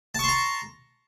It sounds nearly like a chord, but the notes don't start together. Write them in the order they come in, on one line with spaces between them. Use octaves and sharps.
A5 C#6 C6 A#5